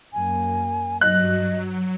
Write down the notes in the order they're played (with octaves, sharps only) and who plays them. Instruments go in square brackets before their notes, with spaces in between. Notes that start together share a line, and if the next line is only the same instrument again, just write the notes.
[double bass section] F#2 A#3 [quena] G#5
[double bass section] G2 [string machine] F#3 [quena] D#5 [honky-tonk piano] F#6